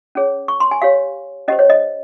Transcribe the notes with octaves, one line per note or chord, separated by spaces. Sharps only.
C#4 G#4 C#5
C#6
C6
G#5
G4 C#5 F5
C#4 G4 C5 D#5
C#5
D#5